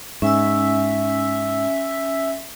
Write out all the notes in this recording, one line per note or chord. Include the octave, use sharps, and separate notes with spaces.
G#2 C#4 E5 G#5 E6